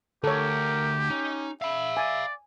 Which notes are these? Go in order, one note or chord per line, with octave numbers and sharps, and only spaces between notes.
D2 G4 A4 A#4 C#5
C#4 D#4
E5 F5 B5
D5 G#5